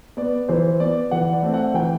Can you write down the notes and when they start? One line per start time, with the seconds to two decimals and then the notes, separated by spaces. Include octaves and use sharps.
0.17 B3 D5
0.49 E3 C5
0.80 B3 D5
1.11 E3 F#5
1.33 D5
1.43 A3 C4
1.54 F#5
1.74 E3 G5